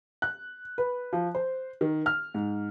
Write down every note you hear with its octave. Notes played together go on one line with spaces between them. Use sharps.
F#6
B4
F3
C5
D#3
F6
G#2